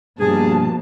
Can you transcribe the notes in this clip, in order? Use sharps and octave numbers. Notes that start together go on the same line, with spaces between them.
G2 B2 F3 A#3 G#4 A5